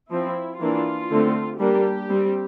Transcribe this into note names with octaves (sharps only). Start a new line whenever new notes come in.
F3 C4 E4
E3 A#3 D4 F4
D3 A3 C4
G3 A#3 D4 G4
G3 C4